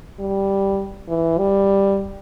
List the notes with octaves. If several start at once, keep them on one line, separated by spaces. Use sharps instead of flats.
G3
E3
G3